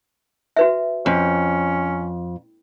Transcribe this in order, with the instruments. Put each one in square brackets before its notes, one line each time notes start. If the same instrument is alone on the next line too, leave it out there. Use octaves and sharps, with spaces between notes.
[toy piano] F#4 B4 E5
[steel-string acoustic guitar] F2 [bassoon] C#4